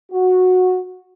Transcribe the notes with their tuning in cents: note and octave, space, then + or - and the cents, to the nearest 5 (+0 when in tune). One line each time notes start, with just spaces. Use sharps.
F#4 -10